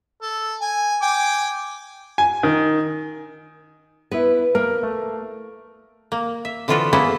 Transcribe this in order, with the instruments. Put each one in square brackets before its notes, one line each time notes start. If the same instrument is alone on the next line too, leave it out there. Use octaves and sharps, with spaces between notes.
[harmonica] A4
G#5
G5 G#5 D6
[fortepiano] G#5
D#3
[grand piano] B3 E4 [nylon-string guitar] B4
[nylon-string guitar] A#3 [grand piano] A#4
[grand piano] A3
[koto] A#3
E5
D3 E3 F3 F4 F#4 A4
A#3 B3 C#4 E4 G#4 A4